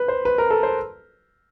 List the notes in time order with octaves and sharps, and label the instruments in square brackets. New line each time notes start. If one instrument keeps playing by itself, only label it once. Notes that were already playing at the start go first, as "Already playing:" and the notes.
Already playing: [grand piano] B4
C5
B4
A#4
A4
C5